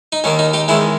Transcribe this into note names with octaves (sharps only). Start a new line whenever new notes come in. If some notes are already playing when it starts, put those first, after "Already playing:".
D#4
D#2 D#3 A#3 C#4
D#4
D#4 G4
E2 D#3 G#3 C#4 E4